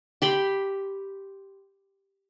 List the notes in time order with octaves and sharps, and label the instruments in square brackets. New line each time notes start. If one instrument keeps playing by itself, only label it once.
[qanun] G4 B5 C6